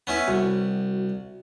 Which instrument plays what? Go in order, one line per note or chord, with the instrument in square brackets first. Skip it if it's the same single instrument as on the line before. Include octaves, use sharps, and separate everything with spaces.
[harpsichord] B3 C#4 E4
[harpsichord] C2 [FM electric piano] F#4